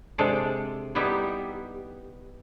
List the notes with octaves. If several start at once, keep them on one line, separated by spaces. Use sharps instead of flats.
C3 G#3 D4 A4 C5 D5
G3 B3 D#4 E4 G4